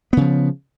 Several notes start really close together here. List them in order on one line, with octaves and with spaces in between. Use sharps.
B3 C#3 F3